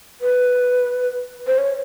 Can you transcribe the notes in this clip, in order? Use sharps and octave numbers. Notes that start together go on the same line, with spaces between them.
B4
C5
C#5